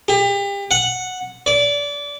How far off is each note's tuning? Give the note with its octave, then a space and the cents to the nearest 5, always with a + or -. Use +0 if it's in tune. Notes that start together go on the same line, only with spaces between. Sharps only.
G4 +35
F#5 -5
D5 -25